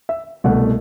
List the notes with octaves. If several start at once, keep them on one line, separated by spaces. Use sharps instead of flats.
E5
C2 B2 A3 F#5